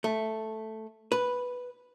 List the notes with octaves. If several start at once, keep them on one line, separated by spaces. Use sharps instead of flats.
A3
B4